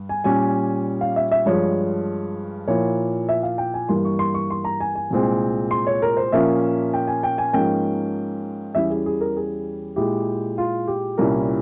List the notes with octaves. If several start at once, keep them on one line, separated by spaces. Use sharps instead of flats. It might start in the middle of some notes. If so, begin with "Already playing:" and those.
Already playing: G2
G#5
A#2 G3 C#4 G#5
F5
E5
E5
G2 F3 G#3 C#5
A#2 F3 A#3 E4 C#5
E5
F5
G5
G#5
G2 E3 G3 A#3 C6
C#6
C6
C#6
C6
A#5
G#5
G#5
C2 A#2 G#3 C4
C6
C#5
A#4
C5
A#2 F3 A#3 C#4 E5
G5
G#5
G5
G#5
G#2 F3 A#3 C#4 G5
E2 E3 G3 C#4 E4 E5
G#4
G#4
A#4
G#4
A#2 G#3 E4 G4
F4
G4
C2 A#2 G3 C#4 E4 A#4